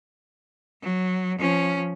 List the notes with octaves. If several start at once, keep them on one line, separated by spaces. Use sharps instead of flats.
F#3
F3 C#4